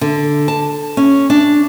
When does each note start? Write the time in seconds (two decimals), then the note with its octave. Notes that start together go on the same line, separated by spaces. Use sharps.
0.01 D3
0.48 A5
0.97 C#4
1.30 D4